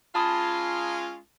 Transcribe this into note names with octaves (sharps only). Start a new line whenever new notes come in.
G#3 C#4 F4 A5 B5 D#6